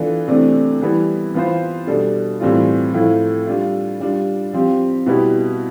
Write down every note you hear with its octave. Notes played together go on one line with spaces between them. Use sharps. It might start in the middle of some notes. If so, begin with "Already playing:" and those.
Already playing: E3 B3 D4 F4 A4
C3 E3 A3 D4
E3 G3 B3 E4
E3 B3 F4 C5
B2 G3 D4 A4
A2 E3 G3 C4 F4
A2 F3 A3 E4
G3 D4 F4
G3 D4 F4
F3 C4 G4
B2 G3 B3 E4 G4